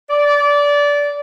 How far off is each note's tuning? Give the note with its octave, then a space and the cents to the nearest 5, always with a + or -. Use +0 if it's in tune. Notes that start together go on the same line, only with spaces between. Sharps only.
D5 -20